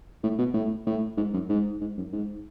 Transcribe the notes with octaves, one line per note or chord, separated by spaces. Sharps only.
A2
B2
A2
A2
G#2
F#2
G#2
G#2
F#2
G#2